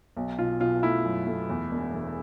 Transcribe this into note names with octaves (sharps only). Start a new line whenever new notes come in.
B1
B2 F4
B2 F4
A3 E4
F#2
A3
E2
E1
E1